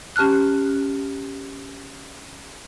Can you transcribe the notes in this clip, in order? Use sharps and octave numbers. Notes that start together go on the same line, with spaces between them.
C#4 G4 A5 F6 F#6